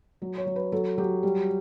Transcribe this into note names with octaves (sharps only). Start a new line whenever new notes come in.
F#3
C#5
F#3
B4
F#3 A4
F#3 G4
G3